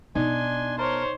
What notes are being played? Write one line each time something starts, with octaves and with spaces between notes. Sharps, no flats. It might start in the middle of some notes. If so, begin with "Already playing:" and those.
B2 D4 D#4 G#5 C6
A#4 C5 C#5 A5 C6